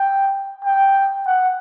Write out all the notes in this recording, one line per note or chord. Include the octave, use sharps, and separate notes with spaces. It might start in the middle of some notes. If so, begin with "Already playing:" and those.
Already playing: G5
G5
F#5